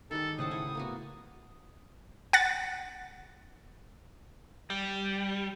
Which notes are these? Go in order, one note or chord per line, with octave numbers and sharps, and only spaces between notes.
D#3 G3 G#3 A4
A2 C#3 C5 F#5 A5 D#6
E4
A#3 B3 F#4
F#5 A6
G3